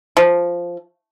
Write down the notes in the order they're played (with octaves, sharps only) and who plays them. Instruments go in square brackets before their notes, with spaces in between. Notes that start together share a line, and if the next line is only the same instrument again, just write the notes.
[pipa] F3